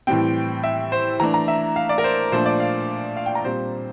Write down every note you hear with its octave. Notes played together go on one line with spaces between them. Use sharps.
A2 E3 G3 C4 G5
E5
C5
E3 A3 D4 A#5
A#5
E5
F5
D5
A#4
C5
A#2 F3 A3 D4 C5
D5
F5
F5
G5
A#5
A#2 G3 C4 C5